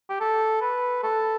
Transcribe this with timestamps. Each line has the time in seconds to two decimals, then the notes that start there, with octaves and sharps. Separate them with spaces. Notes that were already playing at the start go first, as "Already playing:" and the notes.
0.09 G4
0.20 A4
0.61 B4
1.03 A4